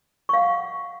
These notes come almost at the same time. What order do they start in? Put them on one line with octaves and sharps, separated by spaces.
C#6 F5 F#5